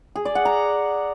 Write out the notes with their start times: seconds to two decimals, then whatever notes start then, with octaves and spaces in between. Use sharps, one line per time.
0.15 G#4
0.25 D5
0.35 F#5
0.45 A#5